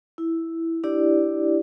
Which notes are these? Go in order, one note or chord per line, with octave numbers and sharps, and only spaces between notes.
E4
D4 E4 G4 D5